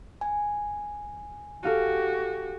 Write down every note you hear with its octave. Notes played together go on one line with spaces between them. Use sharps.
G#5
F#4 G4 A4 F5 D#7